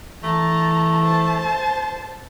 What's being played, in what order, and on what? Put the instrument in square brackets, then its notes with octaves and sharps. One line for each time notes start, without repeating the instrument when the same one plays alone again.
[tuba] E3 [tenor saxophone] A3 [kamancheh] A5 A#5
[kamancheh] C5 A5